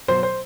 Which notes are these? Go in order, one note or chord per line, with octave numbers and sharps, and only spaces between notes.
B2 F#3 C5
C5